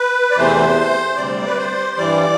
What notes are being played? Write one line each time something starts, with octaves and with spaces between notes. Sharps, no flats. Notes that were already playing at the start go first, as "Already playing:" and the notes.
Already playing: B4
D5
E2 C3 E3 A3 C5
D2 C3 G3 D5
B4
C5
G2 E3 G3 D5